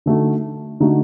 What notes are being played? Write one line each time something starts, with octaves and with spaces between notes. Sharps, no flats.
D3 A3 D#4 F#4
D3 A3 D#4 F#4